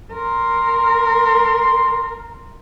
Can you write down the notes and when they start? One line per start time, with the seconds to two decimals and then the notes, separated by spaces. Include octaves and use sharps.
0.13 A#4 C6